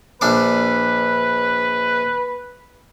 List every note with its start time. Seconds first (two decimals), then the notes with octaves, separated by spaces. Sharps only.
0.21 A#1 D4 B4 D6